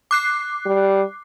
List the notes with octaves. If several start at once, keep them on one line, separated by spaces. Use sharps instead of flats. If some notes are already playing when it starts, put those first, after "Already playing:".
D6 F#6 C7
G3